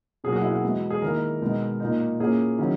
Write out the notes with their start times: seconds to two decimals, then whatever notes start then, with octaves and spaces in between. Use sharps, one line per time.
0.24 B2 F#3 A#3 G#4
0.32 F#4
0.41 E4
0.51 F#4
0.64 E3 G#3 B3
0.90 G#4
1.02 D#3 A#3 E4 A#4
1.42 B2 G#3 B3 D#4
1.80 A#2 A#3 D#4
2.20 A#2 A#3 C#4 E4 G#4
2.58 D#3 F#3 C#4 E4